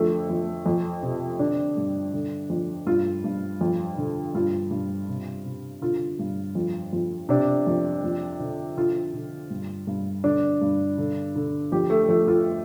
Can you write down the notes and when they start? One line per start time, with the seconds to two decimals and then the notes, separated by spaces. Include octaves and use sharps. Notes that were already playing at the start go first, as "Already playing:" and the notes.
Already playing: F2 D3 A3
0.30 F2
0.66 F2
1.03 C3
1.39 D3 D4
1.77 G2
2.14 D3
2.50 F2
2.87 G2 F4
3.24 G2
3.61 F2
3.98 D3
4.35 G2 F4
4.71 G2
5.08 C3
5.45 C3
5.81 D3 F4
6.19 G2
6.55 F2
6.93 F2
7.29 C3 D4
7.67 F2
8.04 F2
8.40 D3
8.77 D3 F4
9.14 D3
9.50 G2
9.87 G2
10.24 D3 D4
10.61 G2
10.98 D3
11.36 D3
11.72 F2 G4
11.90 A3
12.09 F2 A3
12.28 F4